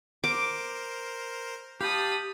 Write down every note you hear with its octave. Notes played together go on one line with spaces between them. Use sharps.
A#4 C5 D6
G4 F5 A5 B5 D#6